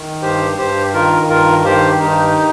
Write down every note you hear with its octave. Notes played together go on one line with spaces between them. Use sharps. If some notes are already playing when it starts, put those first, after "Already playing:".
Already playing: D#3
G2 G4 C5
G2 G4 C5
D#3 F4 A#4
G2 F4 A#4
D#3 G4 C5
G2 D#4 G4